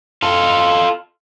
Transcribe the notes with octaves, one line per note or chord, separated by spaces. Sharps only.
F4 A4